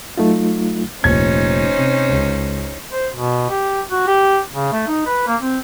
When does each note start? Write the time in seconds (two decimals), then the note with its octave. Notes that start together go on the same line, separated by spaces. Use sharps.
0.18 F#3 A3 D#4 F4
1.04 F1 A#2 C#4 D#4 C5 G#6
1.77 C3
2.09 C#2
2.93 C5
3.14 B2
3.50 G4
3.91 F#4
4.07 G4
4.54 C#3
4.72 A3
4.87 D#4
5.06 B4
5.27 A#3
5.41 C4